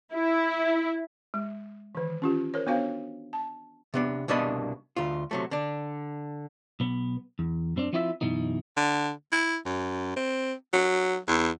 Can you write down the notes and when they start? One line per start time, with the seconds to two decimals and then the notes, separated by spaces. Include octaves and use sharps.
0.13 E4
1.34 G#3
1.95 D#3 E3
2.22 C#4 F4 G4
2.54 A#4 C5 C#5
2.67 B3 D4 F#4 C5 C#5 F5
3.33 A5
3.94 C3 B3 D4
4.28 C2 B2 A#3 D4 D#5 B5
4.96 D2 F4
5.31 C3 F#3 A3
5.51 D3 D4
6.80 B1 B3
7.39 E2
7.76 F#2 C4 D4
7.93 F3 C4 E4 F4 D5 E5
8.21 F#2 B2 E3 D#4
8.76 D3
9.32 E4
9.65 F#2
10.16 C4
10.73 F#3
11.28 E2